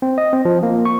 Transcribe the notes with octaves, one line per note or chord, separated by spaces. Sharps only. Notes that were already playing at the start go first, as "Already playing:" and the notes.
C4
D#5
C4
F3
A#3
C#6